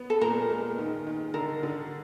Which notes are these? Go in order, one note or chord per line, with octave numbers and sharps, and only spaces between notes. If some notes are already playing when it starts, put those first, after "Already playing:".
Already playing: B3
A4
A#2 A#4
G#3
D#3
D#3
D3 A#4
D3